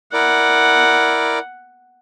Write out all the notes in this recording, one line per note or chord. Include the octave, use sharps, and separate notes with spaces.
E4 A#4 D5 F#5